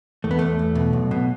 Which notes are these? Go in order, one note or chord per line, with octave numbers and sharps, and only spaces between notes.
E2 A3
B3
E2 A3
E2
B2
B1
B2